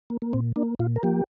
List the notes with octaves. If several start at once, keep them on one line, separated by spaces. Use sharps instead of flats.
A#3
A#3
A#2 C4
A#3 D4
A#2 F4
A#4
F3 A#3 G4